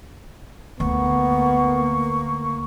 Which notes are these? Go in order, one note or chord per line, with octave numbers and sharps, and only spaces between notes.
D2 A#3 B3 C#6